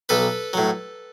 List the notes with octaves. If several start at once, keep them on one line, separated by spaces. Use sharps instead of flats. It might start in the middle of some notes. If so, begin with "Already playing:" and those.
B1 A4 B4
A2 F#3